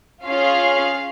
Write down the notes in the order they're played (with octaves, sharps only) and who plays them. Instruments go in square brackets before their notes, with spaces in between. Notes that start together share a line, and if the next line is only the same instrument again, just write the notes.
[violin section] C#4 F4 G#4 F5